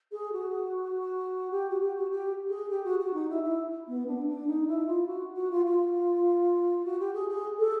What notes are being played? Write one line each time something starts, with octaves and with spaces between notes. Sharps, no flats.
G#4
F#4
G4
F#4
G4
F#4
G4
G#4
G4
F#4
F#4
D#4
E4
E4
B3
D4
D4
D#4
E4
F4
F#4
F#4
F4
F4
F#4
G4
G#4
G#4
A4